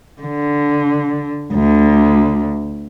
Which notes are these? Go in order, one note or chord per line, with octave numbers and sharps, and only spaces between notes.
D3
D2